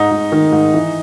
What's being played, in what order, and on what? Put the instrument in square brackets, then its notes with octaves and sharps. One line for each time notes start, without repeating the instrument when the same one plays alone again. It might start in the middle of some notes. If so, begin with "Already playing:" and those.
Already playing: [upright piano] G#2 [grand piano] D#4
[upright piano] G#2
D#3
G#2
E3